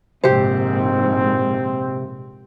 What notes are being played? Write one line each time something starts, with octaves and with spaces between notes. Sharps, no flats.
A#1 G#2 C3 C4 G4 C5